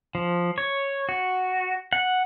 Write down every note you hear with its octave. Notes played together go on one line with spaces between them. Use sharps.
F3
C#5
F#4
F#5